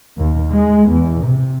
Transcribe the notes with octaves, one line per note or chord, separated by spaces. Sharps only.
D#2
G#3
E2
C3